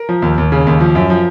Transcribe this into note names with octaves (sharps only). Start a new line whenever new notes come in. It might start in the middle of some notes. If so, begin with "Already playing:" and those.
Already playing: A#4
F3
D#2
D#2
C#3
D#2
F3
F#2
F3